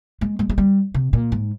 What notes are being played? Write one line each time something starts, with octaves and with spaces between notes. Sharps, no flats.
G#3
G#3
G#3
G3
C3
A#2
G#2